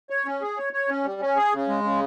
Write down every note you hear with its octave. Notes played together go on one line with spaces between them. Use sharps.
C#5
C#4
G#4
C#5
C#5
C#4
G3
C#4
G#4
C#3
G#3
C#3